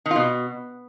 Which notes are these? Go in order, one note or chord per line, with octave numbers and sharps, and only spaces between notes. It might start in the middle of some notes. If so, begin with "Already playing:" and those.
D#3
F4
B2